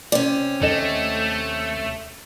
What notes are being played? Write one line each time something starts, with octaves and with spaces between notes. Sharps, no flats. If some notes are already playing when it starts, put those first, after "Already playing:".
C3 C#4 D5
D#2 A3 A4 D#5